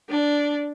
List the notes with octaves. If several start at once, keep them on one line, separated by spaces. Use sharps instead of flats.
D4